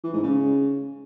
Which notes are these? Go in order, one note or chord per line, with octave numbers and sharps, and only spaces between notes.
E3
G#2
C#3